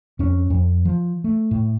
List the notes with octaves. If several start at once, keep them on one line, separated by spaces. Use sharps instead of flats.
F2 C#4
F2
F3
A3
A2